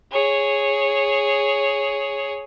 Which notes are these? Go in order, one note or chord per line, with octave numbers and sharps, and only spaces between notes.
G#4 C#5